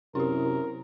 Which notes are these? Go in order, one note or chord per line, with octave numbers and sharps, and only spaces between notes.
F#2 C3 E4 G4 A#4